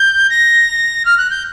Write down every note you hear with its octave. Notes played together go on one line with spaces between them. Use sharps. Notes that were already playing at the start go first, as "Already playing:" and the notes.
Already playing: G6
A#6
F6
F#6
G6